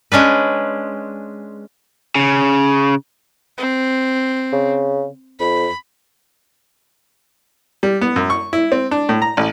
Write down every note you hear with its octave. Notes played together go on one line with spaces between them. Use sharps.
G#3 C#4 D4 B4
C#3
C4
C#3
F2 B5
G3
B3
F#2
C#6
E4
C4
D4
A2
A#5
A1